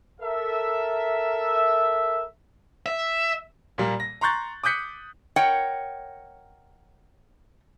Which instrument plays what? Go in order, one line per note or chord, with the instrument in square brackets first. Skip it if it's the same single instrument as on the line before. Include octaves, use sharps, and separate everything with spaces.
[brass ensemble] A4 A#4 E5
[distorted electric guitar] E5
[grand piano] A#2 G3 A#3
A#6
A#5 C6 C#6 F#6 G6 A6
D6 D#6 F#6 G6 B6 C#7
[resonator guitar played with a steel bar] A#4 C#5 D#5 F#5 G5